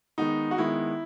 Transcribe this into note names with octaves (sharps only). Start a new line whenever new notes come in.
D#3 G#3 B3 D#4
F#4
D#3 G#3 B3 E4